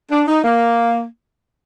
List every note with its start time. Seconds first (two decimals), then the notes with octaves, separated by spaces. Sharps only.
0.11 D4
0.28 D#4
0.44 A#3